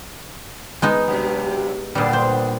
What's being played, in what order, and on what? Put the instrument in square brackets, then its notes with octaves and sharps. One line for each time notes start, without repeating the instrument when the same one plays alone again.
[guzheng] G#3 B3 D#4
[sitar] G2 C3 F#3
[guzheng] A#2 G3 [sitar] D3 B3 D4
[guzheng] C5